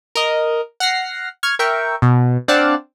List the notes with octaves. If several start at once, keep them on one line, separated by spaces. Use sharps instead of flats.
A#4 D#5
F#5 F6 A#6 C7
C#6 F6 G#6
A#4 E5 G5 C#6
B2
C4 D4 D5 F5 F#5 A5